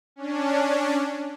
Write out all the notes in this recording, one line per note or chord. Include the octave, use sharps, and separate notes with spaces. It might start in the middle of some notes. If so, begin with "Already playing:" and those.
C#4 D4